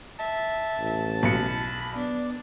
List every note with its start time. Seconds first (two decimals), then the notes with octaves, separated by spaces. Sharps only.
0.20 E5 A5
0.80 A1
1.23 B1 B5 C#7
1.95 B3 D4